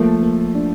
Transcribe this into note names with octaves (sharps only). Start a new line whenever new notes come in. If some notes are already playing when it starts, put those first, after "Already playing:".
Already playing: F3 A3 A#3
A#3
D4